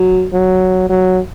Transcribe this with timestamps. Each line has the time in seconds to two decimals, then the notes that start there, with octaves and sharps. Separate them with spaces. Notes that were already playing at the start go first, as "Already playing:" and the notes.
Already playing: F#3
0.33 F#3
0.89 F#3